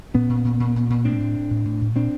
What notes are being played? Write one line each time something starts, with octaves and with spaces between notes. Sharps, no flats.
A#2 B3 C#4
A#2
A#2
A#2
A#2
A#2
A2 C4 D4
A2
A2
A2
A2
A2
A#2 C4 D4